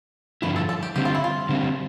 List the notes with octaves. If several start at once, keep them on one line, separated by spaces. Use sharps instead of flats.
G2 D3 F3 E4 B4
A4
A4
G4
D3 G3 C4 G4
F4
E4
F4
D3 G3 C4